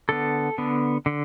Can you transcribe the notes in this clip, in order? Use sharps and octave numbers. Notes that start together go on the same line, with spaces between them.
D3 B3 A4
D3 B3
D3